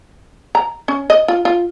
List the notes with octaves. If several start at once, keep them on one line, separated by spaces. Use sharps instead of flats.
A#5
C#4
D#5
F4
F4